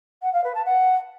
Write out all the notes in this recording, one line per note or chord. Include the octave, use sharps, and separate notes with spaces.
F#5
F5
B4
A5
F#5